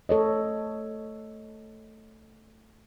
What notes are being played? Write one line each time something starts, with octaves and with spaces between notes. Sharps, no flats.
A3 A4 C#5 D#5